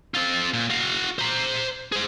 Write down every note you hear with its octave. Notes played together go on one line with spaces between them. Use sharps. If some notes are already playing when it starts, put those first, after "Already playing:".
C4 F4
A#2
F#4 F5
C5 A#5
G#4 C5